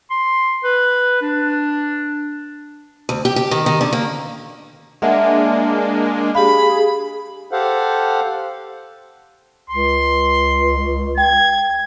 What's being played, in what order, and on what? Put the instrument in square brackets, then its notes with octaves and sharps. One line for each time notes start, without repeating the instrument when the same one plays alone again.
[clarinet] C6
B4
D4
[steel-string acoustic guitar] D2
G4
G4
D#3
D#3
D3
A#3
[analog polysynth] G#3 A#3 D4 [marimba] E5 F#5
[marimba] G4 F5 [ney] G#4 [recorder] B5
[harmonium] G4 A4 C5 F5 F#5
[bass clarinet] C#2 [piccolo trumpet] C6
[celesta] G5 [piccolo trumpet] G#6